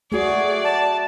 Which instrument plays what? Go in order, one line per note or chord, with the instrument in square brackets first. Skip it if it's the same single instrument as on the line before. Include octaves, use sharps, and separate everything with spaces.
[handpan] A3 F#4 [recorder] G#4 [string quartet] D5
[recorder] A5